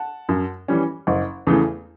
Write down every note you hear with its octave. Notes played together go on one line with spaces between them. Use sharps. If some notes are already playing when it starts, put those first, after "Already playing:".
Already playing: F#5 A5
F#2
E3 G3 C#4
F#1
E2 C#3 E3 A3